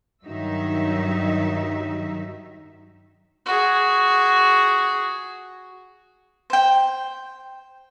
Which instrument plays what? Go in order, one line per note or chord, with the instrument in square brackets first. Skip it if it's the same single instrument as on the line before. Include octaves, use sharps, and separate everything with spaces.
[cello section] G2 D#3 F#3 D#4 E5
[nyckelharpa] F#4 G#4
[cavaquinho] C5 G5